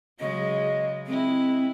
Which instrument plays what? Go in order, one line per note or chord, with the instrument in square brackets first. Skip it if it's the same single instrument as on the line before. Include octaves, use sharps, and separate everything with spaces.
[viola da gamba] C#3 F#3 G#3 [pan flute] D#5
[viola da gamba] G#3 E4 [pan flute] C4